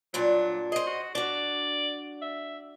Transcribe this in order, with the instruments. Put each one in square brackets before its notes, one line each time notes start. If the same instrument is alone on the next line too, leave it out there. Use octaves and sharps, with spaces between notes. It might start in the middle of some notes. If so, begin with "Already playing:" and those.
[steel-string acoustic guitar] G2 A#2 D4 [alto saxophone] F#3
[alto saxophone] G#4 [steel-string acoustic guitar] C5 D#5
[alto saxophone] F#4
[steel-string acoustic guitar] D4 F#4 [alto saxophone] D5
[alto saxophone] E5